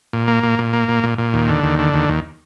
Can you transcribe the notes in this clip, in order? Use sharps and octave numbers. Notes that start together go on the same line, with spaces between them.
A#2
A#3
A#2
A#2
A#3
A#2
A#2
A#2
D#2
D3
D#2
D3
D#2
D#2